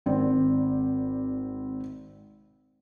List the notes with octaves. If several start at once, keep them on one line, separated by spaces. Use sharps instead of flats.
G#1 C4 D5